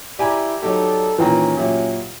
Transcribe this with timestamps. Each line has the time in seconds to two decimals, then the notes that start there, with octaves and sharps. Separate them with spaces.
0.19 E4 G4 D5 G#5 A#5 B5
0.63 F#3 D#4 G4 A4
1.18 A#2 D#3 E3 C#4 B4 G5 A#5
1.57 A#2 F#3 G4 E5